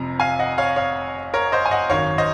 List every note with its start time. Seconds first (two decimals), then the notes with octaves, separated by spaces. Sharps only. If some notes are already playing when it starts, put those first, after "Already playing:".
Already playing: F1 F2 C3 A#5
0.20 F5 G#5
0.39 D#5 F#5
0.58 C#5 F5
0.76 C#5 F5
1.34 A#4 C#5
1.52 C5 D#5
1.65 G#5
1.71 D#5 F#5
1.90 G#1 F#2 D#3 C#5 F5
2.18 C5 D#5